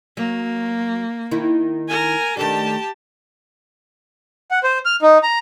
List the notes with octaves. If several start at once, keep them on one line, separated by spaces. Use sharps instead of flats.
F#3 A#3
D#3 E4
A#4 G#5
D#3 A3 D4 G4 A5
F#5
C5
F6
D#4
A#5